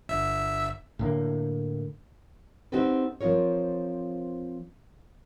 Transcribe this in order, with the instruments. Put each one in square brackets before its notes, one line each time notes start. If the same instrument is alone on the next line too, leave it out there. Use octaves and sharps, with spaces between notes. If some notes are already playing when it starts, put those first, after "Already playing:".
[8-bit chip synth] G1 E5 E6
[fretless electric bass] A2 D3 A#3
[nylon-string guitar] C4 D#4 F#4 G4 A4 B4
F3 C4 F4 A#4 C#5